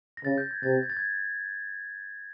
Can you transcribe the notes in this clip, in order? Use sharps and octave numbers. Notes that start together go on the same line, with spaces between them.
A#6
C#3 A6
G6
G#6
C3 A6
G#6
A6
G#6